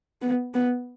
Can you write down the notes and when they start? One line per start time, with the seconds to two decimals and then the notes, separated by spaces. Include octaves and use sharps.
0.22 B3
0.54 B3